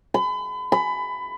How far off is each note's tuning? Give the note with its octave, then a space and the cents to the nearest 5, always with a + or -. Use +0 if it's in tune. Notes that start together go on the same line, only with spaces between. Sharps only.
B5 +35
B5 +20